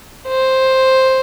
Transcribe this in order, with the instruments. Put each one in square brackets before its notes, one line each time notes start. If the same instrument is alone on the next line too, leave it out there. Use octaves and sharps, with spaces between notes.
[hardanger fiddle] C5